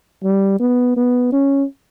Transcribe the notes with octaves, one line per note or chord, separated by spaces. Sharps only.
G3
B3
B3
C#4